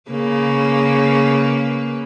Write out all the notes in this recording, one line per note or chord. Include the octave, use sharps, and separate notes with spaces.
C#3 A#3 B4